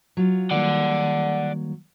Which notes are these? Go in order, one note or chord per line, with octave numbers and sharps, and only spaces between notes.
F#3 F4
D#3 G3 A#3 D5 F#5